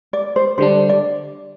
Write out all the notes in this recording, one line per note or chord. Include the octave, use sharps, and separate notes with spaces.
D5
C5
D3 G3 D4 C5
D5